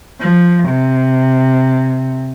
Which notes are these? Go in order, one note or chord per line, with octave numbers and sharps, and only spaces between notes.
F3
C3